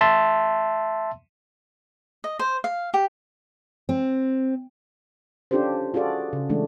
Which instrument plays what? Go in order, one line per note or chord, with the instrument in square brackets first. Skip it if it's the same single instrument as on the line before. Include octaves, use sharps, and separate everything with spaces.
[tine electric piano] E5 A5 C6
[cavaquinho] D#5
C5
F5
G4
[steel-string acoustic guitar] C4
[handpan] C#4 D4 F4 G4 A4 C5
F4 F#4 G#4 A4 D5
C#3
E3 G#3 A3 D4